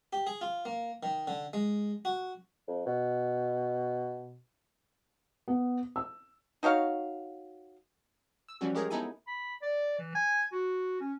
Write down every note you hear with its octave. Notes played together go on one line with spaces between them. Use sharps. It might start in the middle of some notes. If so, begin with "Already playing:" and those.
G4
G#4
F4
A#3
D#3
D3
G#3
F#4
F2
B2
B3
E6
D#4 F#4 C#5 F5
E6
E3 F3 G3 C#4 F#4
G#3 G4 G#4 A#4 C#5
B3 D#4 E4 A4 G#5
B5
D5
E3
G#5
F#4
C#4